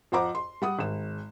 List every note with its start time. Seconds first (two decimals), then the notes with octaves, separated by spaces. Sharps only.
0.12 F2 F4 C5 F#5 A#5 D6
0.35 C6
0.62 G3 F#5 D#6
0.79 G#1 E7